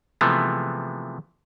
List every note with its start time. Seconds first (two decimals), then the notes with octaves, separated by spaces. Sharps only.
0.21 C3 E3 F3 G#3 A3 B3